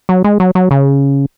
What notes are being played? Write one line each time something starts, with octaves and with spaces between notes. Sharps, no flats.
F#3
G#3
F#3
F#3
C#3